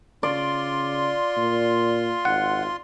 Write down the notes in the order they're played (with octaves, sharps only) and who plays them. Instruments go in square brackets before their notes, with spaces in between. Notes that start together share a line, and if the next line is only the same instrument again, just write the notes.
[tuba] C#3 [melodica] F4 C6 [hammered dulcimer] D5
[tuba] A#2
[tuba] G#1 [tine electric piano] F#5